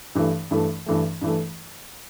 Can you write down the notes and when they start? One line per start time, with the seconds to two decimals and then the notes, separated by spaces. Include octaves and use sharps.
0.15 G2 E3 A3
0.51 G2 E3 A3
0.86 G2 E3 A3
1.21 G2 E3 A3